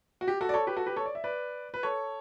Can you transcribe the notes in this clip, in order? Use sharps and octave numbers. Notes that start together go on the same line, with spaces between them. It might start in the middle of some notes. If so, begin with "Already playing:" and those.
F#4
G4
F#4 A4
D5
A4 C#5
G4 B4
F#4 A4
G4 B4
A4 C#5
D5
E5
B4 D5
B4
A4 C#5